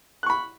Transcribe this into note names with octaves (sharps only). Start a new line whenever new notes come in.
B5 C#6 F#6